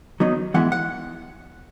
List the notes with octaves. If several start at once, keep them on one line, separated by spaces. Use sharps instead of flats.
D#3 F#3 B3 D#4
G#2 E3 G#3 B3 E4 F#5
F#5